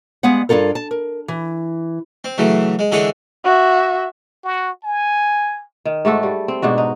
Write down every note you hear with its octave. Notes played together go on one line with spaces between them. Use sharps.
G3 G#3 B3 F5 F#5
G2 D4 F4 A4 A#4
A5
A#4
E3
C4
C#3 E3 F#3 A3
G#3
D3 E3 G#3 G#4 A4 C#5
F#4 E5
F#4
G#5
D#3
G#2 A3 F#4 A4
G3
C4
G#2 B2 D4 F#4
D#4